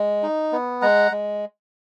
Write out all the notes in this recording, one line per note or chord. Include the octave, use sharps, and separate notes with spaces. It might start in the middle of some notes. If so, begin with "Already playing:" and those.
Already playing: G#3
D#4
B3
G#3 F#5 A#5
G#3